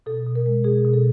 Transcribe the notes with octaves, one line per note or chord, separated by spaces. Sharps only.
B2 A4
B2
A#4
G#3
B2 G#4
B2
A4